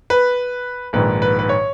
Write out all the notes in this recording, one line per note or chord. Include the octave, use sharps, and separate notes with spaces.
B4
A#1 G#2 D#3 B4
B4
B4
C#5